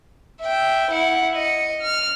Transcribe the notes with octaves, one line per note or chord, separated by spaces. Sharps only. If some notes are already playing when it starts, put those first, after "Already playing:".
E5 G5
E4 F#5
D#5 C#7
F6